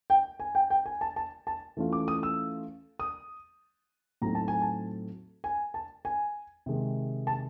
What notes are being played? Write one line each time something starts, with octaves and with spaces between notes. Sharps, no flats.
G5
G#5
G5
G5
G#5
A5
A5
A5
E3 A3 C#4 F4
D6
D#6
E6
D#6
A2 F#3 A3 C4 D#4 A#5
A5
G#5
A5
G#5
A5
G#5
C3 D#3 G#3
A5